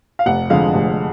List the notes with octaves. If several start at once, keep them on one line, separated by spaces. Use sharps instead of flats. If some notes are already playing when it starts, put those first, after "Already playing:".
F5
F1 F#5
F2 D3 G#3 F5
F1